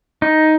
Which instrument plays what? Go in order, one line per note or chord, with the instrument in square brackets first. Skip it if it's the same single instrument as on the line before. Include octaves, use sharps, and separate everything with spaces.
[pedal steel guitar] D#4